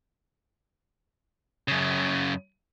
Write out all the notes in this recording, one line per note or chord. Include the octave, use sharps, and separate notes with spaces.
F#2 C#3